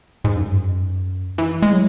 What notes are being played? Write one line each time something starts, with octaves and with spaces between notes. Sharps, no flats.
G#2
F#2
E3
G#3
F#3